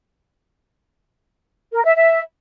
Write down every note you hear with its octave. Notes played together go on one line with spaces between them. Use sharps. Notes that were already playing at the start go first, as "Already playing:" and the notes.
A#4
E5
E5